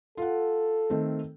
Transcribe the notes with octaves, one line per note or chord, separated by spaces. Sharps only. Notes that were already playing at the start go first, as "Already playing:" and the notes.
F4 A4 F#5
D#3 A3 C4